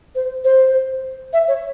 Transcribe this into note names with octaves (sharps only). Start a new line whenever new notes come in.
C5
C5
E5
C#5